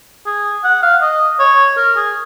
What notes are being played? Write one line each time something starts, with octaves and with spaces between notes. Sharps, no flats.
G#4
F#5
F5
D#5
C#5
A#4
G#4